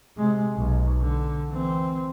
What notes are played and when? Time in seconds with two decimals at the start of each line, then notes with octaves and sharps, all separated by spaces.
0.18 C3 G#3
0.56 B1
1.01 D3
1.50 E3 C4